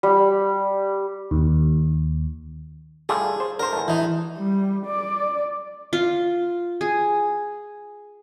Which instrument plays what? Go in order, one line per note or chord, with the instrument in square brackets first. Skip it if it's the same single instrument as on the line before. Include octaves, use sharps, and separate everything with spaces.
[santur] G3
[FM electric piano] D#2
[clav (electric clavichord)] G3 A3 F4 [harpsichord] G#4
[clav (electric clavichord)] C5
[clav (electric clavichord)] D3 C5 [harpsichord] A#4
[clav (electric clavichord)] E2 A3
[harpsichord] E3 D#4
[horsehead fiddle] G3
D5
[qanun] F4
G#4